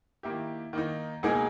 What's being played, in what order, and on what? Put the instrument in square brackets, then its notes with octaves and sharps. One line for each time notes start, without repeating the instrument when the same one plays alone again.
[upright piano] D#3 A#3 E4 G4
D#3 A#3 D#4
C#2 B2 A#3 D#4 G#4